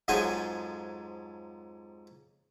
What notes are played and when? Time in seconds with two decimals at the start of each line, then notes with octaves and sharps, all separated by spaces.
0.08 F2 G#2 F#3 G#4 C5 G#5